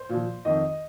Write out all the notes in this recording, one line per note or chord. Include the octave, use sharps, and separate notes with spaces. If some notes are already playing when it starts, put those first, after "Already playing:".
Already playing: C5
A#2 F3
F2 D#3 D#5